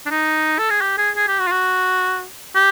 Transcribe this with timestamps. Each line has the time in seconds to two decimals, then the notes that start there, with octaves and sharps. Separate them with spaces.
0.06 D4
0.10 D#4
0.59 A4
0.70 G#4
0.81 G4
0.98 G#4
1.16 G#4
1.28 G4
1.39 F#4
1.47 F4
1.51 F#4
2.55 G4